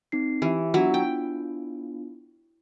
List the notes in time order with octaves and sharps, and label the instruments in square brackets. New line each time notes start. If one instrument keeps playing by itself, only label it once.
[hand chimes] C4 D#4 C7
[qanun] E3 [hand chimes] G4 E5
[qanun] F#3 E4 [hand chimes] B3 D4 F4
[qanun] G5